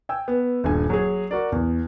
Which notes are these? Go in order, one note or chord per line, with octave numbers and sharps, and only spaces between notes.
G5 G#5 E6
B3
D#1 G2 G#5
F#3 G#4
F#4 A#4 D5
E2